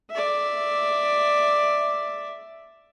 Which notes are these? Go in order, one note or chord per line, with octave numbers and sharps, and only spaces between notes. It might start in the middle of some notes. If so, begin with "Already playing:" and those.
D5 E5